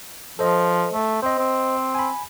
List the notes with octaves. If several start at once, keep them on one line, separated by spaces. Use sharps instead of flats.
F3 A4 C5 D#5
A3
C4 C5 D#5
C4
G#5 B5